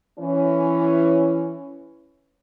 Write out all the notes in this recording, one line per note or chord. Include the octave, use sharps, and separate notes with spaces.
E3 C#4